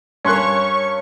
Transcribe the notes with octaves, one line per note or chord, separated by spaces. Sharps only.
G2 C#4 A#4 C#5 C6 C#6 F#6